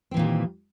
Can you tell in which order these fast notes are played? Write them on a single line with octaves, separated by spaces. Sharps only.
C4 E3 A#2 D#3 G3